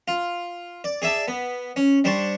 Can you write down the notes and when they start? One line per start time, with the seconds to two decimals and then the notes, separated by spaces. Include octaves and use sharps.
0.08 F4
0.84 D5
1.02 G#4 D5 E5 A5
1.28 B3
1.76 C#4
2.04 G3 D4 C5 A5 C#6